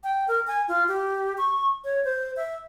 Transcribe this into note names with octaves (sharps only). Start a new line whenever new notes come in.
G5
A#4
G#5
F4
G4
C#6
C#5
C5
E5